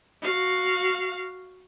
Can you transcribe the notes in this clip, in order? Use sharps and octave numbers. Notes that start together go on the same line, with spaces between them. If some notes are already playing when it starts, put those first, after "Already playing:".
F#4 F5